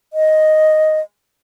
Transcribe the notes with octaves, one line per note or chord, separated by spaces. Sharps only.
D#5